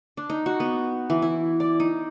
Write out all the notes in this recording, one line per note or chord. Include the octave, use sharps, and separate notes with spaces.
D4
D#4
F#4
B3
E3
E4
D5
D#4